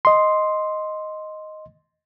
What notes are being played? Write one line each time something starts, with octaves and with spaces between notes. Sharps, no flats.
D#5 C6